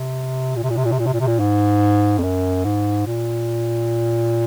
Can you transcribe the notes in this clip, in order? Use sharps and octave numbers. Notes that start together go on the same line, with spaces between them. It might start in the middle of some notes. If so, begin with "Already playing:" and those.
Already playing: C3
A#2
C3
A#2
C3
A#2
C3
A#2
C3
A#2
C3
A#2
G#2
F2
F#2
G#2
A#2